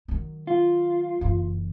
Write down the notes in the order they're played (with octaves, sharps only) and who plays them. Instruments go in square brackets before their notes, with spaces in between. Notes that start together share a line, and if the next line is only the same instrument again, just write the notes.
[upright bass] D#3 F#3
[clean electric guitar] F4
[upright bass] F#1 E3